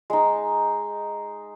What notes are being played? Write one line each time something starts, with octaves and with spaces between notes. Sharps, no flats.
G#3 D#4